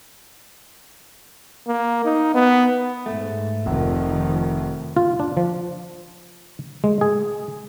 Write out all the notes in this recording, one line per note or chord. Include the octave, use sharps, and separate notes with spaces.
A#3
D#4
B3
G#2 A3
F1 D#3 F3
F4
D4
F3
G#3
G#4